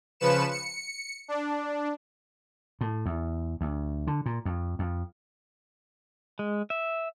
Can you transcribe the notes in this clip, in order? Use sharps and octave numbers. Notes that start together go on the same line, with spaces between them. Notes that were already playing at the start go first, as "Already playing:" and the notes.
C#3 F3 B4 C#7 E7
C#7
D4
A2
E2
D2
D3
A#2
F2
F2
G#3
E5